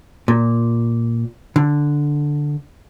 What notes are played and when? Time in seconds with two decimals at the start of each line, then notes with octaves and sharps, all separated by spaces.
0.28 A#2
1.56 D3